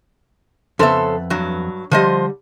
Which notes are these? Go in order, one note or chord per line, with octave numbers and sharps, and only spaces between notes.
F2 C#3 B3 A4 C5 E5
G2 F#3
D3 F3 G3 C5 D#5